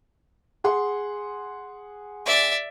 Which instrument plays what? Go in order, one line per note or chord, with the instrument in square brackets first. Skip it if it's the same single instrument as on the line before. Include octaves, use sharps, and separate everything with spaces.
[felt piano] G#4 F#5 C6
[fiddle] D5 E5